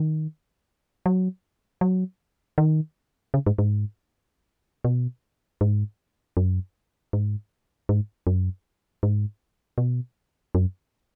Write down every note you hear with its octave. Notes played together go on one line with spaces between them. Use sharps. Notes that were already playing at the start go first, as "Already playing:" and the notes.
Already playing: D#3
F#3
F#3
D#3
C#3
G#2
G#2
B2
G#2
F#2
G#2
G#2
F#2
G#2
B2
F#2